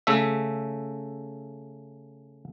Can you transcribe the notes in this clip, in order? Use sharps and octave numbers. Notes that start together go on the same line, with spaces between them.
C#3 A3 E5